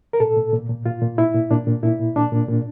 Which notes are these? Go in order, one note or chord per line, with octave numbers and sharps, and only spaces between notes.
A#4
A#2 A4
A#2
A#2
A#2
A#2 F4
A#2
A#2 E4
A#2
A#2 D4
A#2
A#2 E4
A#2
A#2 D4
A#2
A#2